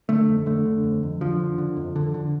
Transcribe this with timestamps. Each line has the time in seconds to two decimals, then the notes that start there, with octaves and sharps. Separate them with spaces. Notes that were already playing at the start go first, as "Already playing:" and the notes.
0.09 D3 A3
0.28 F2
0.46 D3 A3
0.66 D3
0.84 F2
1.03 F2
1.21 D3 F3
1.39 D3
1.58 D3
1.77 F2
1.96 D3
2.14 D3